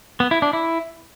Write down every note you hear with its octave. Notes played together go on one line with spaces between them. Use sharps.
B3
E4
D4
E4